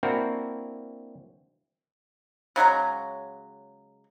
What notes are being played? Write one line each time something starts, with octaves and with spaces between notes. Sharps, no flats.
A#3 C4 D4 E4 F#4 A#4
C#3 F#3 G#3 A#5